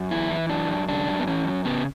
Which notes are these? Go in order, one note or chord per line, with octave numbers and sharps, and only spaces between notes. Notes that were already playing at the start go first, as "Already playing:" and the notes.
Already playing: F#2
E3 E4
E3
F#2 D4
F#2
C#3 D4
F#2
B3
E3 C#4
F#2
C#3 B3